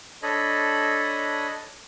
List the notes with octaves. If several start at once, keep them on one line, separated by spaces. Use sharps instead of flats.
D4 A4 C#5 D#5 B5